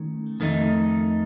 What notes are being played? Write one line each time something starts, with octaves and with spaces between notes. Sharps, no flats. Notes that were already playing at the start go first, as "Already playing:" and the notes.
Already playing: D#3 A3 C#4
F2 D#3 A3 C4 D#4